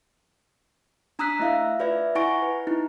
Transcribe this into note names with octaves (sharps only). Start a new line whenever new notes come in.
D4 A#5 D#6 E6 F#6 B6
A3 E4 E5 F5
F4 B4 D5 E5
E4 F#5 G#5 C#6 A#6 D7
B4
D#4 E4